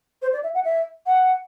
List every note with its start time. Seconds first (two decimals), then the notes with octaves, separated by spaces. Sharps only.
0.22 C5
0.32 D5
0.43 E5
0.54 F#5
0.64 E5
1.06 F#5